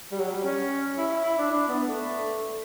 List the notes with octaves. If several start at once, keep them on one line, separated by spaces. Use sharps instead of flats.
G3
F#3
G3
C#4
E4
E4
E4
D4
D4
B3
A3